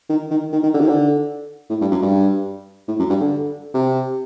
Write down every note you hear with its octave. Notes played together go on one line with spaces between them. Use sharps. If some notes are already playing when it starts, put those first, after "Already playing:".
D#3
D#3
D#3
D#3
D3
D#3
D3
A2
G2
F#2
G2
A2
F#2
G2
D3
C3